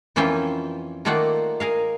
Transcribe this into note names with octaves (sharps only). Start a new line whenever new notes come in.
F2 E3 A#3 C#4 F4 G5
D#3 A3 A#3 F4 D5 F#5
G#4 A#4 F5